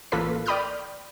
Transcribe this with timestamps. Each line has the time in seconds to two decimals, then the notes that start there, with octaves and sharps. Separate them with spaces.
0.12 A1 A#3 F4 A4 B4 B6
0.46 D5 G5 B5 D#6 F6 G6